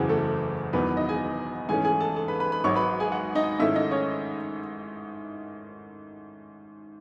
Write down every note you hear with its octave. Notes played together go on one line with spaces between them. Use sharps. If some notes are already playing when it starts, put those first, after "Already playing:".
Already playing: F#1 E2 C#3 E3 F#4 G#4
A3 A4
E1 E2 D#3 F#3 B3 B4
D#4 D#5
G#4 G#5
G#2 E3 A3 C#4 G#4 G#5
G#4 G#5
A4 A5
A4 A5
B4 B5
B4 B5
B4 B5
G#1 G#2 F#3 C#5 C#6
B4 B5
G#4 G#5
F#4 F#5
D#4 D#5
G#2 D#3 A3 C#4 E4 E5
D#4 D#5
C#4 C#5